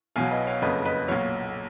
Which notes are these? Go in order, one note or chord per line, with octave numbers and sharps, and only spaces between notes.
B1 B2 F#3 F5 G#5
B4 D#5
C#5 F5
F#1 F2 C#3 F#3 B4 D#5
B4 D#5
B1 A#2 F#3 C#5 F5